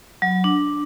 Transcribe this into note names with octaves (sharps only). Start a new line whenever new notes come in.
F#3
D4